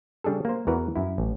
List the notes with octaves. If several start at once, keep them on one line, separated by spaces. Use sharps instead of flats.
C#3 G3 D4 G#4 A4
A#3 C5
E2 E3 F#4 A#4 B4
F#2 E4
A1